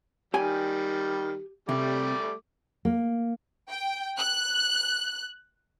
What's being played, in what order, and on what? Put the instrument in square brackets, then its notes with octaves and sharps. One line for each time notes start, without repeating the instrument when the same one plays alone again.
[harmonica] D#3 G3 [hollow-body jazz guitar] G4 G5 G#5
[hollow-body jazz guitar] C3 [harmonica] G3 A3 D6
[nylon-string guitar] A#3
[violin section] G5
F#6